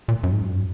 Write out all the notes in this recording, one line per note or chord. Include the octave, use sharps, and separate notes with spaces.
A#2
F#2
G#2
F#2